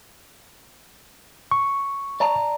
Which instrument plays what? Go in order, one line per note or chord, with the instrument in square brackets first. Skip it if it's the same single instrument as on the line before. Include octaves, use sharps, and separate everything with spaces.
[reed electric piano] C#6
[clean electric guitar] D5 A5 A#5